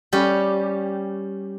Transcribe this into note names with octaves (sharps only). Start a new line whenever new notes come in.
G3 C#4 G4